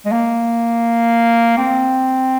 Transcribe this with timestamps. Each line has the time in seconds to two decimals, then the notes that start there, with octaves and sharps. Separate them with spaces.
0.05 G#3
0.12 A#3
1.58 C4